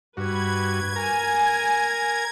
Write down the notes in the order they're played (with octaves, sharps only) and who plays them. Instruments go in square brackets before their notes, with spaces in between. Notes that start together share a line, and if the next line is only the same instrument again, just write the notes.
[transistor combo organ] G2 F#4 [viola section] B4 [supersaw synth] G#6
[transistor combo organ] A#4 A#5 [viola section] G#5